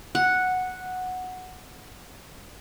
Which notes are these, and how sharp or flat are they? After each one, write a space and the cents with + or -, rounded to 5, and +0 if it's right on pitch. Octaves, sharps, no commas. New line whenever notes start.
F#5 -5